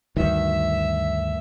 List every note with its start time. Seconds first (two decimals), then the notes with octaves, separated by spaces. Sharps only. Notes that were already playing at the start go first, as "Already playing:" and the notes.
0.17 D2 G2 D#3 E5